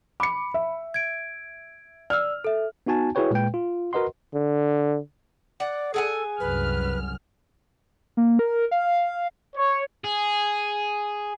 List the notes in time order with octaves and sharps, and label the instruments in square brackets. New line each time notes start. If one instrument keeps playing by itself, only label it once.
[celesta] B5 [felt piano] D6 C#7
[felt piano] E5
[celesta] G#6 D7
[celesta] D5 E6 [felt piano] F6
[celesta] A4 E5
[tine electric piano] B3 D#4 F#4 G#5 A5
E4 F#4 G#4 B4 C#5 G5
A#2 G#3 B4 G5
F4
F#4 A#4 B4 D#5 F#5 C6
[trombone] D3
[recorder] D5 [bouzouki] F#5
[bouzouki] G#4 F#5 G#5 [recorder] A4
[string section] C2 F#2 F6 [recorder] B4
[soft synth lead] A#3
A#4
F5
[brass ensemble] C#5
[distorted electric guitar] G#4